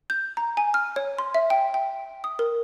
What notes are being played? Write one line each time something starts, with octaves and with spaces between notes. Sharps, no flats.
G6
A#5
G#5
F6
C#5
C6
E5
G5
G5
D#6
A#4